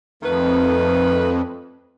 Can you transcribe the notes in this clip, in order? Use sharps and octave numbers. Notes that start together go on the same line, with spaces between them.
F2 D#3 A3 B4